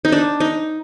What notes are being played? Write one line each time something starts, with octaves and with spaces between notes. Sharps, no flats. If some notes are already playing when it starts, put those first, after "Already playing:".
D#4
D4
D#4